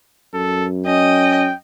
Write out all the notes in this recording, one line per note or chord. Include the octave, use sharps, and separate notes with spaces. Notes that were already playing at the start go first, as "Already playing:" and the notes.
F#2 A4
C#4 D#5 G5